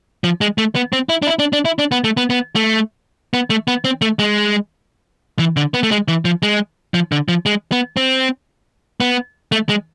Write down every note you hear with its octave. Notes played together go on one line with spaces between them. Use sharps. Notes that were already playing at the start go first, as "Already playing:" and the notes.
F3
G#3
A3
B3
C4
E4
D4
E4
D4
D4
E4
D4
B3
A3
B3
B3
A3
B3
A3
B3
C4
A3
G#3
E3
D3
B3
A3
G#3
E3
F3
G#3
F3
D3
F3
G#3
B3
C4
B3
A3
G#3